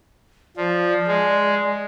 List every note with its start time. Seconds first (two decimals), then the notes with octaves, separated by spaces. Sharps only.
0.57 F3 D5
1.07 G#3